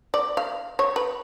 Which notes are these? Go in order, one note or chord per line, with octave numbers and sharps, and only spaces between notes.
D5
F5
C#5
B4